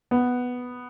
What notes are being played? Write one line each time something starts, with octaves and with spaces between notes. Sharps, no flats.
B3